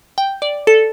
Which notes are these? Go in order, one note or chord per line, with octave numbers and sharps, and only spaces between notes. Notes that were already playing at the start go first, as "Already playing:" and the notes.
G5
D5
A4